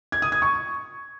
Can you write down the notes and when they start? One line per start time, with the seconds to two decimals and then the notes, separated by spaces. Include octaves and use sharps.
0.12 G#6
0.22 D#6
0.32 G#6
0.42 C#6